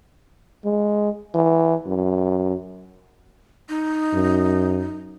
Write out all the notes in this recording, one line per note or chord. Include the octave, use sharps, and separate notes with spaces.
G#3
E3
F#2
D#4
F#2